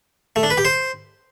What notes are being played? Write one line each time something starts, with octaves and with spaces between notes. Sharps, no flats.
A3
D4
B4
G4
C5